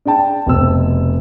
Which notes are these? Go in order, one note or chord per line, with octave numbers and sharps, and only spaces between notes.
D4 G#4 G5 A5
F1 B2 C5 E6